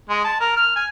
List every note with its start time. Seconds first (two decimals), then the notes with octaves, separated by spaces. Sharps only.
0.10 G#3
0.25 A5
0.40 A#4
0.57 F6
0.76 G#5